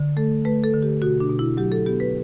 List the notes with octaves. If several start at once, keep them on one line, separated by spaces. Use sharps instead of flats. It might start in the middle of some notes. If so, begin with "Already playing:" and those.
Already playing: D3
A3 A4
A3 B4
A4
D3
G4
B2 F#4
D4
B2
E4
F#3 G4
A4
B3 G4
B4